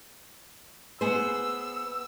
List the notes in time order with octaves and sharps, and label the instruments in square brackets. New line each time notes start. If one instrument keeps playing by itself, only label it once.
[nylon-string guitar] B3 G#4 C5 [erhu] E6